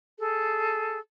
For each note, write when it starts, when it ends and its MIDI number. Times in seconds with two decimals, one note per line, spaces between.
0.17 0.98 68
0.17 0.98 69